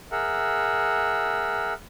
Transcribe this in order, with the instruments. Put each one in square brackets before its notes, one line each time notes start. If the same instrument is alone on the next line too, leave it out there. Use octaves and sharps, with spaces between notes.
[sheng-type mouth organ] G#4 A#4 E5 F#5